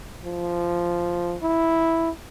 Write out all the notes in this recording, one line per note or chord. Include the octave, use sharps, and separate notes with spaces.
F3
E4